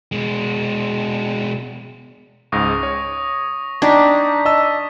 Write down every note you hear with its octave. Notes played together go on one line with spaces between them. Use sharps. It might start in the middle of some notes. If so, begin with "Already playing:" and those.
B2 G#3
C#2 G#2 C#6 D#6 A#6
C#5
D4 D#4 G5 A#5 G#6 B6
D#5 A5 E6